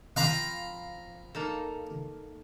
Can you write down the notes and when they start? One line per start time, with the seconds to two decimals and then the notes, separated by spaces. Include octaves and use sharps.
0.16 F3 C4 F5 A#5 B5
1.35 A#3 D#4 A4